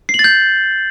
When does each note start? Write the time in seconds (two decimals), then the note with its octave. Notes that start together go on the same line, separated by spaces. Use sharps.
0.09 C7
0.14 F#7
0.19 A6
0.24 G6